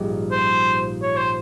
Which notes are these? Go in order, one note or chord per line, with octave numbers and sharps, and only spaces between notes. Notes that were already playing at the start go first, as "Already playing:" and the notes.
Already playing: A#1 G#2 G3
C5
C#5
C5